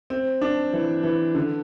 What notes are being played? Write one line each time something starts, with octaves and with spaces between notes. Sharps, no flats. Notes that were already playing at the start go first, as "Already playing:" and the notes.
C4
D4
E3
E3
D3